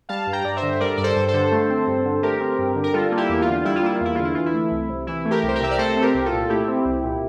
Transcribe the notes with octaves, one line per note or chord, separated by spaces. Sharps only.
G3 F5 A5
G2
G5 A#5
G2 D5
C5 E5
D3
G3 A#4 D5
G2 D5
A4 C5
G2
A4 C5
D3
A3
C4
G2
D3
A3 G4 A#4
C4
G2
D3
A#4
G3 F4 A4
A#3
E4 G4
E2
F4
D3
G3 E4
F4
A#3 E4
F4
E2 E4
D3 F4
E4
E3 F4
E4
A3
C2
C3
E3 E4
A3
G4 A#4
C2
C5
G4 A#4
C3 E5
D5
A3 A4 C5
C4
G4 A#4
C2
F4 A4
A#2
A3 E4 G4
C4
C2
A#2